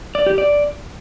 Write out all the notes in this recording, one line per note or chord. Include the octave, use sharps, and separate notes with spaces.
D5
G4
D5